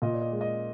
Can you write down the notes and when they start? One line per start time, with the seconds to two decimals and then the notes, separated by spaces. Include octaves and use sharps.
0.02 A#2 D#5
0.13 D5
0.22 D#5
0.32 G#3
0.41 D#5